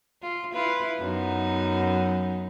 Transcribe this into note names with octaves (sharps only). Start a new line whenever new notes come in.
F4
E4 F4 B4
F#2 B3 D#4